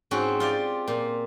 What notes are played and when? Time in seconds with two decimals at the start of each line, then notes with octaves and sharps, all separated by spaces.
0.11 G#2 C4 C#4 F#4
0.40 F4 G4 D5
0.88 A#2